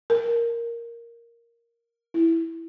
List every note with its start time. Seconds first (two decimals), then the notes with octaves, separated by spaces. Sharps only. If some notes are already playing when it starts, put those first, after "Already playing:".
0.10 A#4
2.14 E4